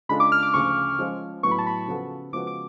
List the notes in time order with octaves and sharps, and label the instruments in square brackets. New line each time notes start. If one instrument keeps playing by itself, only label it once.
[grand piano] C#3 G#3 D4 F4 A4 [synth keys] B5
[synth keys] D6
F6
D6
[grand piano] D2 C#3 F3 [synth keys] C#6
[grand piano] F3 G#3 C#4 F4
[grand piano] A2 F#3 B3 [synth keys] C#6
[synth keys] B5
A5
B5
[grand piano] C#3 F3 B3 F#4 A4
[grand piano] C#3 F3 G#3 B3 F#4 [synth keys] D6
[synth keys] D6